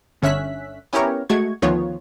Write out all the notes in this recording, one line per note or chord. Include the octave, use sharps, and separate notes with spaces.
G1 D3 C#4 E5 F#6 B6
B3 C#4 E4 G4 A#4 C#5
G#3 A3 F#4 C#6 G#6
D2 D#3 F3 B3 F4 C#5